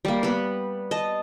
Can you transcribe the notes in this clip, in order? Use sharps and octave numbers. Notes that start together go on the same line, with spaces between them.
G3 A#3
B3 B4
D#5 A5